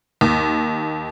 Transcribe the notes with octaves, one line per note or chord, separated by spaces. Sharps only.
D#2